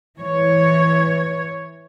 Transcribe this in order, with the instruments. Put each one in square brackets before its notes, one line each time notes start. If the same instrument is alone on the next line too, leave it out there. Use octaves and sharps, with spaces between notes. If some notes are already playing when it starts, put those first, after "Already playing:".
[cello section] E3 C#5